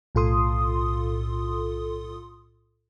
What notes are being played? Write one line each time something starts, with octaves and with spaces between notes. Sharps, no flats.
B1 A2 F4 A4 C6 D#6